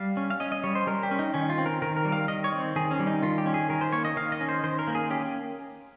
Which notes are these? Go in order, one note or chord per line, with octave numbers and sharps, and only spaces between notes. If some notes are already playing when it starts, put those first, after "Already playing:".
Already playing: G3 F5
C#4
F5
C#4 D#5
D#5
G3 C#5
C5
G3 A#4
G4
C#4
D#4
D#3 C#4
F4
C4
A#4
D#3 A#4
A#4
G3
F5
D#3 D#5
C#5
C4
D#3 G#4
C#4
G3
D#4
D#3 F4
G4
C#4
G#4
D#3 A#4
C5
A#3 C#5
D#5
D#3 F5
D#5
C#4
C5
D#3 C5
A#4
A#3
G#4
C#4 G4